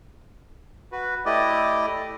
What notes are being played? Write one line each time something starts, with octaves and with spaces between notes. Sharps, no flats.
F#4 B4
A3 E4 G4 D5 D#5